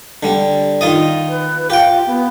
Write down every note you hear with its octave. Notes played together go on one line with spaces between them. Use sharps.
D3 G3
D#3 F4 D#5
B4
F4 G4 G5
B3